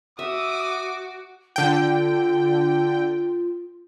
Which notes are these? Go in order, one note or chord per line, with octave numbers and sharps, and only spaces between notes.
F#4 E5 D6 D#6
D3 F4 G5